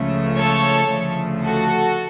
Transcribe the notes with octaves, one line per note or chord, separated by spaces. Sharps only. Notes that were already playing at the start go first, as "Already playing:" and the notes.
Already playing: C#2 C#3 F3 A3
A4 C#5
D2 C#3 F3 A3
F#4 A4